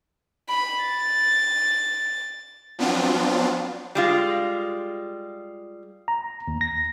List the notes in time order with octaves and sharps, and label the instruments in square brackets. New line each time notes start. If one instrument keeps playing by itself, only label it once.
[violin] B5
A6
[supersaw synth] F3 F#3 B3 C4 D4 F4
[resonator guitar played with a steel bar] G3 G#3 F4
[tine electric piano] A#5
D#2
A#6